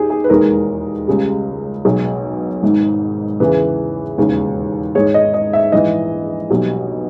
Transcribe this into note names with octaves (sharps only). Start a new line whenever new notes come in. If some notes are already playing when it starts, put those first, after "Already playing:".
Already playing: D#2 D#3 G4 G#4
G#4
B4
E1 D#2 D#3 G#3 A#4
C#2 C#3 G3
B1 B2 G#3
G#1 G#2 D#3
E2 C#3 E3 B4
E1 D#2 C#3
G#1 G#2 D#3 G#3 C#5
D#5
D#5
E5
A#1 G#2 E3 D#5
B1 B2 G3